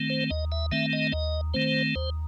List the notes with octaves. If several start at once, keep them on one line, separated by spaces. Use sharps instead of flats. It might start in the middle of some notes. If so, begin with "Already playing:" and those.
Already playing: D#3 A3 C4
C5
D#2 D#5
E5
D#3 A3 C4 E5
D#5
D#2 D#5
D#3 A3 C4 C5
D#2 C5